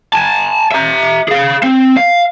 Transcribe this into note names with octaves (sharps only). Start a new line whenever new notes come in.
G#5 A5
E5 A#5
G#4 F5
C4
F5